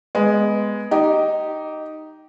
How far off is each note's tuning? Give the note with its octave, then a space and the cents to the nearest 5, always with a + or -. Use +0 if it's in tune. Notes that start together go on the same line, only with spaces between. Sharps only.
G#3 +0 B3 +0
D#4 +0 G4 -15